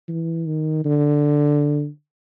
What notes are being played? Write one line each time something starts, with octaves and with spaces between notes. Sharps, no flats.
E3
D#3
D3